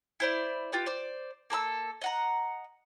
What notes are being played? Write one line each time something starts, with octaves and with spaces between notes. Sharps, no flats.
E4 C5 D5
F4 G4 B4
C5 D5
A#3 A4 A#5 E6
D#5 F#5 A#5